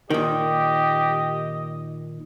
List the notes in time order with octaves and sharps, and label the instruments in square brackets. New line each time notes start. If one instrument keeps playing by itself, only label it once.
[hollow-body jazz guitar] A#2 D#3 [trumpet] G4 [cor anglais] D#5